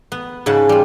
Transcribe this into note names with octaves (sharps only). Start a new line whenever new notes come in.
B3
G#2 C#3 F#5 A5
G3 F4